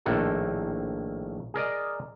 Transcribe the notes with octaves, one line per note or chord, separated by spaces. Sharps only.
A#1 A2 D#3 A#3 A4 F#5
G#4 A#4 D5 D#5